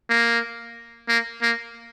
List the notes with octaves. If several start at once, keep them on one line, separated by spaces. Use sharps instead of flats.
A#3
A#3
A#3